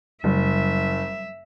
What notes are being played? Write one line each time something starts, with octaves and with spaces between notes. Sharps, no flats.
F#1 F#3 G3 E5